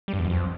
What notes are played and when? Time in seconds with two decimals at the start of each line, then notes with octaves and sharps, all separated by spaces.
0.08 G3
0.14 G2
0.19 E2
0.25 F#2
0.30 F2